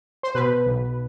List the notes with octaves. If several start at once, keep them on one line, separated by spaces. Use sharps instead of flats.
C5
B2 B4
B1